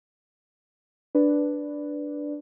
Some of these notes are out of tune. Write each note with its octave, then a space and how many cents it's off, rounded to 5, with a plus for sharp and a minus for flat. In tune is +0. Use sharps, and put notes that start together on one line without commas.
D4 +0 B4 +0 D5 -5